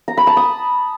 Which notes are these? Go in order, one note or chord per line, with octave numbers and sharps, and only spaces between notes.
A#5
B5
A5
D#6